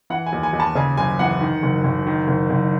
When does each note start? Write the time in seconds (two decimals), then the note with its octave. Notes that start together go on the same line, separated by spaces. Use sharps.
0.10 E3 F#5
0.26 G#5
0.33 D#2
0.43 G#5
0.53 D#2
0.60 A5
0.75 C#3 G#5
0.97 F#1 G#5
1.19 E3 F#5
1.41 D#3
1.63 F#1
1.84 F#1
2.07 D#3
2.28 F#1
2.50 F#1